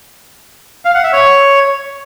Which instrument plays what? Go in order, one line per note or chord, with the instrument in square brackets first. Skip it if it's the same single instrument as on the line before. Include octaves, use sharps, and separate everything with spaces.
[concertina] F5
F#5
E5
C#5